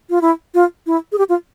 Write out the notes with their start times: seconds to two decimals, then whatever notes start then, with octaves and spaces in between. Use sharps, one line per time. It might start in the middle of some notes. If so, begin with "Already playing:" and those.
0.10 F4
0.21 E4
0.54 F4
0.87 E4
1.12 G#4
1.18 G4
1.29 F4